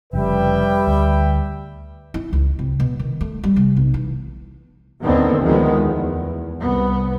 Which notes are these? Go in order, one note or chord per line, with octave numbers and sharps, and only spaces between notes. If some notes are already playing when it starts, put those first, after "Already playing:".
F1 F2 C#3 G3 B4 E5 G5
D2
E4
C#2
C3
B2
D#3
A3
G3
C3
B1
E3
D#2 D3 D#3 B3 C4
D2 D#3 F3 G#3 B3
E2
C2 B3